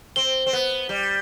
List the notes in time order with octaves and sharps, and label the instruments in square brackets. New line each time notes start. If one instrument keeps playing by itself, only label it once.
[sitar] C4 [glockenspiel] G7
[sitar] C4
B3
G3